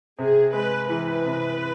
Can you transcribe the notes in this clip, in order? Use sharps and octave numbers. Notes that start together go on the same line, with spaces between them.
C3 G#4
G#3 B4
E3 B4
C3